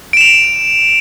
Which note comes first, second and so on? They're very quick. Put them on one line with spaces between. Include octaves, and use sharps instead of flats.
D7 E7 F7